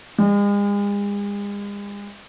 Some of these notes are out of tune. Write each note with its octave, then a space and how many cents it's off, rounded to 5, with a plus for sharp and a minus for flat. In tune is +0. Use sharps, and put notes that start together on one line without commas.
G#3 -40